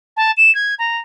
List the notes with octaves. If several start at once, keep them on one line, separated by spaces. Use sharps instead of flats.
A5
E7
G#6
A#5